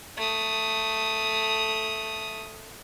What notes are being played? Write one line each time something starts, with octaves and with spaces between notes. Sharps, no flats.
A3 D#6